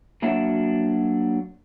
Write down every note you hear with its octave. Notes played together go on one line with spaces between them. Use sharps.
F#3 A#3 D4 F#4 C#5 E5